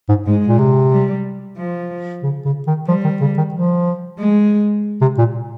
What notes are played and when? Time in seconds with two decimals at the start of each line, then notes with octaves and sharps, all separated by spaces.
0.09 G#2
0.26 G#2 G#3
0.48 A#2
0.59 C3
0.91 G3
1.57 F3
2.23 C#3
2.45 C#3
2.67 D#3
2.88 F3 G3
3.04 D#3
3.21 C#3
3.38 D#3
3.54 F3
4.20 G#3
5.01 C3
5.18 A#2